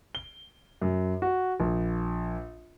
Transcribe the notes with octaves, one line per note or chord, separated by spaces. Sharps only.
G7
F#2
F#4
A#1